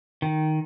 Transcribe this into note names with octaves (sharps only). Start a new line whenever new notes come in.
D#3